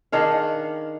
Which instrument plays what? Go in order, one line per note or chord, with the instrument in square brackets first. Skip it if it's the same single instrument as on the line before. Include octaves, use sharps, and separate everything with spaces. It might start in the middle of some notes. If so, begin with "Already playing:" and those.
[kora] D#3 D4 G#4 F5